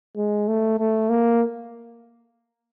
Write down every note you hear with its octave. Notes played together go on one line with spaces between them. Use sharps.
G#3
A3
A3
A#3